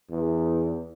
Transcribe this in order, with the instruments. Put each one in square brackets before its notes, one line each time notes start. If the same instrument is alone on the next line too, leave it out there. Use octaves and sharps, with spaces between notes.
[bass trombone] E2